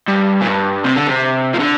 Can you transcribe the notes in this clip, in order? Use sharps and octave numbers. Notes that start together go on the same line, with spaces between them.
G2
A#2
G2
C3
D3
C3
F3
D3